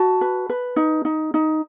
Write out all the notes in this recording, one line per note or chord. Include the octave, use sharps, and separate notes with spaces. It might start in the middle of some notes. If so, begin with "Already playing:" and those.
Already playing: F#4 A5
B4
B4
D#4
D#4
D#4